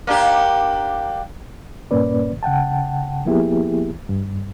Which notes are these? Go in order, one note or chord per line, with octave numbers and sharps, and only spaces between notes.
A#3 D4 G4
G2 A#2 A#3 C#4 B4 D5
C#3 F#5 G5 A5
F3 A#3 B3 E4 G4 G#4
G2